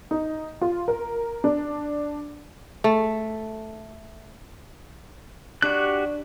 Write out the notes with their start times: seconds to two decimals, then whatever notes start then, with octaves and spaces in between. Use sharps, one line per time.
0.11 D#4
0.61 F4
0.88 A#4
1.44 D4
2.84 A3
5.62 D4 F#4 G4 F#6